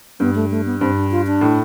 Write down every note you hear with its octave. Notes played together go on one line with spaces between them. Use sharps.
G2 B3
A3
A3
B3
G2 C4
D4
F4
D4
A2